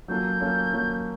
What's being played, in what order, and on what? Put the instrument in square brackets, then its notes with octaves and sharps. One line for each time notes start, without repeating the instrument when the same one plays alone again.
[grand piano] F#3 A#3 C#4 F4 A4 [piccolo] G6
[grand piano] F#3 A#3 C#4 F4 A4
F#3 A#3 C#4 F4 A4